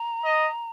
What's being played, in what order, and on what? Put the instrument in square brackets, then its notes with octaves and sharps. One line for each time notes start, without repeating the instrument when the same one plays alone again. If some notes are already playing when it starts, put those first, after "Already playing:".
Already playing: [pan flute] A#5
[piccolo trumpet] D#5